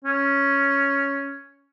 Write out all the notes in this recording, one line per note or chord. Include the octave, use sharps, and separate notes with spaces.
C#4